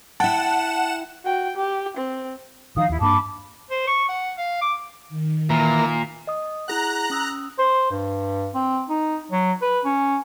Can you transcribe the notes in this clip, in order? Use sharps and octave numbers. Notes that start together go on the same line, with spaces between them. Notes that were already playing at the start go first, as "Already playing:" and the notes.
E4 F#5 G5 A5 E7
F#4 G5
G4
C4
D#3 F3 D#4 F5 D#6
D#2 E4
G2 A#3 D4 A5 B5 D6
C5
C#6
F#5
F5
D6
D#3
A#2 E3 A#3 A#5
D#5 D#6
E4 G#4 F#5 A#5 F#6
C#4 D#6 E6
C5
G2
C4
D#4
F#3
B4
C#4